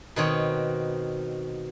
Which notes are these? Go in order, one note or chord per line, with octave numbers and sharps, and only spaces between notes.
B2 D#3 C4 C#5